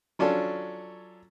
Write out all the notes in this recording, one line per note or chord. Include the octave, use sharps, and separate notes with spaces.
F#3 C#4 D4 F4 A4